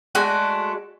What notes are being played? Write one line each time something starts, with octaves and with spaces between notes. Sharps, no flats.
G#3 A3 D4 F#4